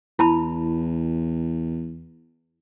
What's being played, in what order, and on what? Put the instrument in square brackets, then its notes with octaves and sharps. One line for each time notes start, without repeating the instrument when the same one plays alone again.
[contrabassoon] E2 [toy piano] E4 A5 B5